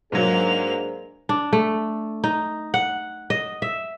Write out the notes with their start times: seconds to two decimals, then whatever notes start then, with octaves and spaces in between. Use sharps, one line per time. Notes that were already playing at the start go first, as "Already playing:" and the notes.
0.12 G#2 F#3 A#3 D4 G#4 C5 F7
1.29 D4
1.53 A3
2.24 D#4
2.74 F#5
3.30 D#5
3.62 E5